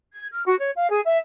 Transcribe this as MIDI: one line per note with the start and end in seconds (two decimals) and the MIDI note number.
0.12 0.27 92
0.32 0.43 89
0.47 0.57 66
0.59 0.71 73
0.76 0.91 77
0.92 1.01 68
1.05 1.18 76